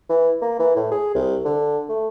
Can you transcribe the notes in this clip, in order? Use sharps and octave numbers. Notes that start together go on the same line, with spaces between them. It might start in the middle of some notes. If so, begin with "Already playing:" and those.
E3
A#3
E3
A2
G#4
C2
D3
A3